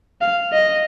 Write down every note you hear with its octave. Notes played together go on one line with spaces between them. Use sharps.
F5
D#5